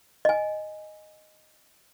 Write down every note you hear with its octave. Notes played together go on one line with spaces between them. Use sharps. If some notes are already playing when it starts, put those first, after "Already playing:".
D#5 G#5